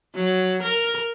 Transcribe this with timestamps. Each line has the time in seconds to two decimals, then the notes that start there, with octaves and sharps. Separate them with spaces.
0.15 F#3
0.63 A#4